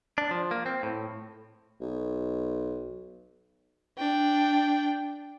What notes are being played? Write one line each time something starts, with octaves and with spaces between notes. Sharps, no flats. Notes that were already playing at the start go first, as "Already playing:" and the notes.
D4
F3
A#3
C4
A2
B1
D4 G5